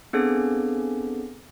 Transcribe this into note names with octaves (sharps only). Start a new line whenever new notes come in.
B3 C4 D4 G#4 A4